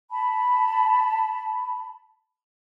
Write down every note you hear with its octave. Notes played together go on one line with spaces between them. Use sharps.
A5 B5